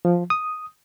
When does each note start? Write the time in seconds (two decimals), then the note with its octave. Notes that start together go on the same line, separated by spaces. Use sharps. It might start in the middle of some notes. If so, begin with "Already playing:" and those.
0.05 F3
0.30 D#6